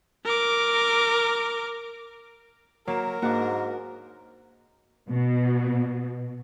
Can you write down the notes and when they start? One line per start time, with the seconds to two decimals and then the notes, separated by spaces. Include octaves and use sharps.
0.25 A#4 D6
2.88 F#3 A#3 A#4 E7
3.22 G#2 A#3 D4 F#4
5.09 B2